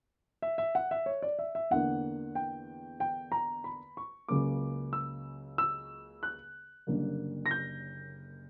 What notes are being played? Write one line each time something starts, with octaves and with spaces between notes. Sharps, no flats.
E5
E5
F#5
E5
C#5
D5
E5
E5
E2 D3 A#3 F#5
G5
G5
A#5
B5
C#6
C#2 C#3 F#3 A#3 D6
E6
E6
F#6
F#1 F#2 D3 G3 A#3
A#6
G6